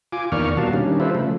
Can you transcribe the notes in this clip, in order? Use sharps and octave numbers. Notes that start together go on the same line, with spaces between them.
F4 G#5 D6
E2 D#3 A#3 D5 C#6 F6
B2 G3 A#3 F#4 F5 A5
D#3 G3 C#4 D4
G3 F4 A4 B4 C5 E5
C#3 F3 A3